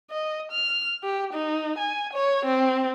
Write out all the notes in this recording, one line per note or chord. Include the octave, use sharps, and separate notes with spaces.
D#5
F6
G4
D#4
G#5
C#5
C4